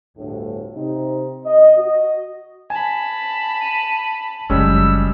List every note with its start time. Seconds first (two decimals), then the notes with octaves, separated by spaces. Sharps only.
0.17 G1 D2 A2
0.76 C3 C4 D#4
1.45 D#5
1.76 F#4 D#5
2.70 G#5 A5 B5
3.61 D#7
4.50 F#1 G3 G#3 C#4 E6